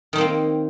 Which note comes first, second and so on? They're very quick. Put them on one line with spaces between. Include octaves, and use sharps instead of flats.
D#3 D#4 C4 A#3